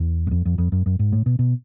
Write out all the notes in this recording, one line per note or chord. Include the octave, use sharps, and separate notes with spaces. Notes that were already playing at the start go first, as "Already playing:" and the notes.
Already playing: E2
F#2
F2
F2
F2
F#2
F#2
G#2
A2
B2
B2